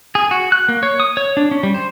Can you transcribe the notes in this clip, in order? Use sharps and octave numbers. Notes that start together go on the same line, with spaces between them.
G#4
F#4
F#6
A#3
C#5
D#6
C#5
D4
C#4
G3
C5